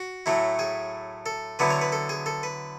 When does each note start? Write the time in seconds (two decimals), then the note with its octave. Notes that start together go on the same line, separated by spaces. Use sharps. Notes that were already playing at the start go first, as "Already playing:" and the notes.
Already playing: F#4
0.26 A2 F#3 A3 E4
0.59 G#4
1.26 A4
1.59 D3 F#3 B3 E4 B4
1.70 C#5
1.81 B4
1.92 A4
2.09 G#4
2.26 A4
2.43 B4